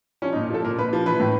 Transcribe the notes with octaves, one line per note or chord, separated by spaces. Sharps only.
F3 C#4
D#4
A#2
F3 A4
A#2 A#4
A#2 B4
F3
E3 B4
A2